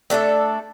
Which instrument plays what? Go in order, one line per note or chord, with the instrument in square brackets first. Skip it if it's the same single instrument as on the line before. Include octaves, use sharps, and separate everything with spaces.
[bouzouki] A3 D4 A4 E5